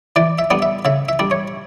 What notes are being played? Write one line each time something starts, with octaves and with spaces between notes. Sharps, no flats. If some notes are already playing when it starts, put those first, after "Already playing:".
E3 D5
E5
G3 B3 D4
E5
C#3 E5
E5
G3 D4
C#5